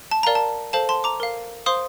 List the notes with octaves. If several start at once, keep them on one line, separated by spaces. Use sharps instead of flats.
A5
A#4 D5 F5 A#5
A5
A4 C5 F5 A5
A5 C6
A#5 D6
A#4 F5
C5 F5 C6 D#6